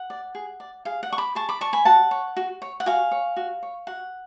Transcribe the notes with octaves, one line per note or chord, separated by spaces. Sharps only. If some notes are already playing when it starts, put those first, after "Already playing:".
Already playing: F#5
D5
G#4
D5
G#4 F5
F#5
D5 C#6
B5 D6
G#4 A5 C#6
B5 D6
D5 A5 C#6
G#5 B5
F#4 F#5 A5
C#5
F#4
C#5
F#5
F#4 F5 G#5
C#5
F#4
C#5
F#4 F#5